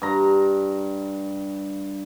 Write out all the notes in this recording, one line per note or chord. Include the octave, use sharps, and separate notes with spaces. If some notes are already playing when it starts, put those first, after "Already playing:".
G2 A#5